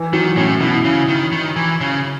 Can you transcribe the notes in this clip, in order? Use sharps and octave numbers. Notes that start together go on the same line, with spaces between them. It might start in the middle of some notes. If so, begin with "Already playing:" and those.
Already playing: E3
D#3 F#3
A2 C#4
B2 E4
C#3
D#3
D#3
E3
C#3